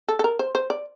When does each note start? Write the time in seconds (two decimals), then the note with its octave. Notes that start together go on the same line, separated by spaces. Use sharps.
0.08 A4
0.19 A4
0.24 A#4
0.39 C5
0.55 C5
0.70 D5